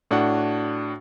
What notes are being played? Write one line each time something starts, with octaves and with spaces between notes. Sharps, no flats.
A2 D4 F#4 F#5